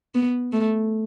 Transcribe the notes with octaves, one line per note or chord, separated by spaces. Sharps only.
B3
A3